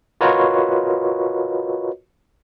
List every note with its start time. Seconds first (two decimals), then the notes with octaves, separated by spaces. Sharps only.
0.21 F4 F#4 A#4 B4 C#5 D#5